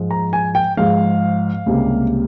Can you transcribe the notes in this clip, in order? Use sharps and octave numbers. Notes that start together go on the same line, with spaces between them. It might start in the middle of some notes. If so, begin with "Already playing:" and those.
Already playing: G#2 F3 G#3
A#5
G#5
G5
G#2 F3 G#3 F5
C#2 C3 G3 A#3